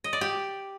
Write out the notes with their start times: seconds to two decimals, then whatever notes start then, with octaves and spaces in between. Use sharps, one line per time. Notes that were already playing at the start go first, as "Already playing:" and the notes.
0.04 D#5
0.13 D5
0.21 G4